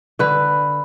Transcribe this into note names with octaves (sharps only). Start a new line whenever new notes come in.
D3 B4